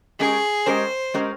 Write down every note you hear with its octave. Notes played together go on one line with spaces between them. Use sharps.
G#3 C#4 G4 G#4 A#4
G#3 C#4 G4 A#4 C5
G#3 C#4 G4 A#4